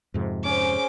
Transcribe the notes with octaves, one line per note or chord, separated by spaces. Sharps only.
F2 G#2 C3
C#4 G#4 C5 D6